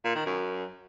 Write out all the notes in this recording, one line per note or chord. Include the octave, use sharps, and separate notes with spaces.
A#2
D#3
F#2